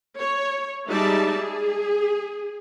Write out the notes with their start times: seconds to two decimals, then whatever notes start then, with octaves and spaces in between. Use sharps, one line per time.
0.19 C#5
0.87 G3 G#3 D#4 D5 E5 A5
1.39 G#4